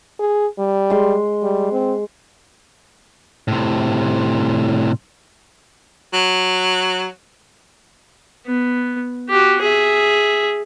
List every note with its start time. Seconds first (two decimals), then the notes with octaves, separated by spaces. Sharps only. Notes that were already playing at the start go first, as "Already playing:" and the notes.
0.19 G#4
0.59 G3
0.90 G#3 C6
1.42 G3
1.72 C4
3.48 A2 C3
6.14 F#3
8.46 B3
9.29 F#4 G4
9.61 G#4 E5